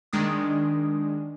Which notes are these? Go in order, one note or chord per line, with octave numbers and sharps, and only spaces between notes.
D#3 G#3 D4 D#6